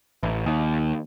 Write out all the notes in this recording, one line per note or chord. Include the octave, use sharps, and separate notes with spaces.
A1
D#2